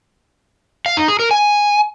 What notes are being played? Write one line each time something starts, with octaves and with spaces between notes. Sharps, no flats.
F5
D#4
G#4
A#4
G#5